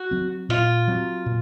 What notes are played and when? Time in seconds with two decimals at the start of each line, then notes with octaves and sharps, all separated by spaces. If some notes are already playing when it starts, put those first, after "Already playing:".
Already playing: F#4
0.11 F#3 C4
0.49 A#2 F4
0.88 F#3 C4
1.26 A#2